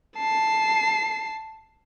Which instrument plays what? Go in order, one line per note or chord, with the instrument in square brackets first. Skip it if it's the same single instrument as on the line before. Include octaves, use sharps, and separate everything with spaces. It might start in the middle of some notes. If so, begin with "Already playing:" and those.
[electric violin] A5 C7